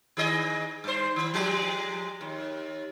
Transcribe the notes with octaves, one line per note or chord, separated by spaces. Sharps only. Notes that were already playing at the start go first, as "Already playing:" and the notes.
D#3 G#4 D#5
G2 C5
D#3
F3 G3 G#3
D#2